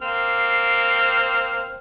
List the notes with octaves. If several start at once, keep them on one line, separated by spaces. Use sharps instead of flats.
A#3 C4 F6